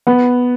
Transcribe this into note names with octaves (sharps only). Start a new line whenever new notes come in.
B3